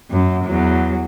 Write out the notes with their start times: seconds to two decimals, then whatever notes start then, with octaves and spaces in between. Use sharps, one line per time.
0.11 F#2
0.45 E2 F#3